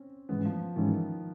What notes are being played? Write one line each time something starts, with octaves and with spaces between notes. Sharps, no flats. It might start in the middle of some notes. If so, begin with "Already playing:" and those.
Already playing: C4 C#4
G#2 E3 G#3 B3 C#4
F3
G#2 D#3 E3 G#3 C#4